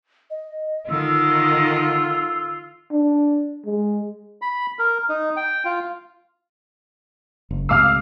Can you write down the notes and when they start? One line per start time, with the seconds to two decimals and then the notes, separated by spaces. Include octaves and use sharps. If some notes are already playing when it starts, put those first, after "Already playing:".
0.30 D#5
0.90 D3 D#3 F4 E6
2.91 D4
3.65 G#3
4.42 B5
4.79 A#4
5.09 D#4
5.37 G5
5.65 F4
7.51 F#1
7.69 C#2 A2 C3 F5 D6 E6 F6 C7